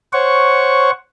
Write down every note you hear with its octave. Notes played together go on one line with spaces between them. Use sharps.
C5 C#5 F#5 C#6